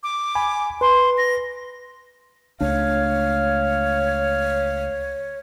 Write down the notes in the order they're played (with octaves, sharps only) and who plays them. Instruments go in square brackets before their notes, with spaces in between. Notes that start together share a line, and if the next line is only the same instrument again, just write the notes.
[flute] D6
[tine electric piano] G#5 B5
[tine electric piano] B4 [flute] C6
[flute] A#6
[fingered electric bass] C#2 A3 D4 [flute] C#5 [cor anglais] F5